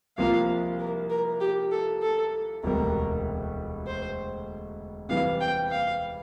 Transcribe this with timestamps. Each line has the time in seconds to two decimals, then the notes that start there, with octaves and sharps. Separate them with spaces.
0.18 C2 C3 F3 A#3 F4 F5
0.79 A#4
1.10 A#4
1.40 G4
1.71 A4
2.02 A4
2.64 E1 D2 C3 G3 A#4
3.86 C5
5.09 C3 E3 G3 F5
5.41 G5
5.71 F5